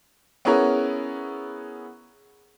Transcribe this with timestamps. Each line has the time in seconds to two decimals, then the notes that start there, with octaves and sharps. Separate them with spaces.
0.45 B3 C#4 E4 G#4 A#4 C#5